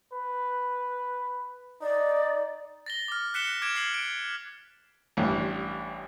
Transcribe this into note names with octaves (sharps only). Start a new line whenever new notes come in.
B4
D#4 D5
A6 A#6 G7
D6 F6
F#6 B6 C#7 E7 G7
D6 G#6 D7 E7
F6 C7 F#7
D7
A1 G2